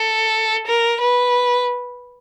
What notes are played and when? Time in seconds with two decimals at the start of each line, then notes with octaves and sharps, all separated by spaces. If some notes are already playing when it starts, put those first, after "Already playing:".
Already playing: A4
0.67 A#4
1.00 B4